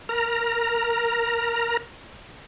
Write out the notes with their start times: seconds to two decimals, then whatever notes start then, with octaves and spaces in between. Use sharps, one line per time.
0.09 A#4 A#5